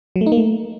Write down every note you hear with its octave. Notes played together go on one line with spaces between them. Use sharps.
F#3
A3
D#4
A#3
A3